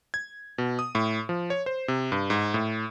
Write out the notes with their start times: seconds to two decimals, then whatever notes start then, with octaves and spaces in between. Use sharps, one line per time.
0.14 G#6
0.58 B2
0.79 D#6
0.95 A2
1.29 F3
1.50 C#5
1.66 C5
1.88 C3
2.12 G2
2.30 G#2
2.54 A2